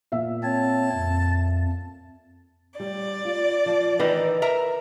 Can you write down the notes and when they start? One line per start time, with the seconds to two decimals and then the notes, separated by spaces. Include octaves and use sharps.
0.12 A#2 E5 F5
0.44 C4 C#5 A5
0.93 F2
2.80 G3 D5
3.25 F4
3.66 F3
3.99 D#3 E3 D#4 B4
4.42 A#4 E5 A#5